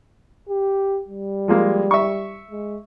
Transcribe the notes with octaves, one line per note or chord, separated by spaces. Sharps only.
G4
G3
F3 G#3 A#3
E5 C#6
G#3